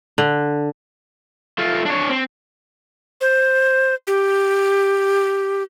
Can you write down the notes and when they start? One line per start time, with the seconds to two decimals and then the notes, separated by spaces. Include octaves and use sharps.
0.18 D3
1.59 A3 F4
1.86 D4 C#5
2.10 C4
3.21 C5
4.07 G4